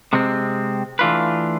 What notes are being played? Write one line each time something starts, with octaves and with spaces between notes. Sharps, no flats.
C3 G#3 C4
E3 A3 D4 F4 B4